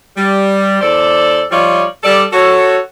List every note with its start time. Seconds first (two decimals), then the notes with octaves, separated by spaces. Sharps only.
0.16 G3
0.80 E2 A4 C5 D5
1.51 F3 G3 D#4 F4 C#5 D5
2.03 G3 A4 D5
2.32 F#4 A4 C#5